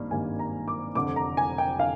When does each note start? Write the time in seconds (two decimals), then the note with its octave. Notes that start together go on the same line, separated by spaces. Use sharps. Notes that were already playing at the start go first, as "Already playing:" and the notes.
Already playing: G#1 G2 D#3 A#3 D5
0.11 G#1 G2 D#3 A#3 G#5
0.39 A#5
0.68 D6
0.95 F1 F2 D3 D6
1.16 A#5
1.37 G#5
1.58 G5
1.79 D3 F5